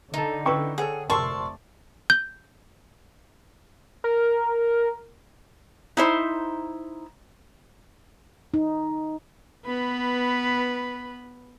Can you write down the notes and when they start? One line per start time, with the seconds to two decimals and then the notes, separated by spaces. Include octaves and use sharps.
0.14 D3 D#4 A4 D#5
0.45 C#4 E4 B4 G5 C#6 E6
0.78 G#4 A4 C#5 F#5
1.10 F1 C3 A#4 D5 A5 C6 C#6 E6
2.10 G6
4.04 A#4
5.97 D#4 E4 C5
8.54 D#4
9.66 B3 B4